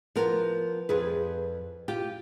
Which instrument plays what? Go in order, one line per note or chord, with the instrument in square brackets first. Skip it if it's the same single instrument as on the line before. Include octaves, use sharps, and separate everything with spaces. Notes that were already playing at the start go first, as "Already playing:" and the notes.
[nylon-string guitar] F3 B3 A#4
F2 G#4 B4
F4 G4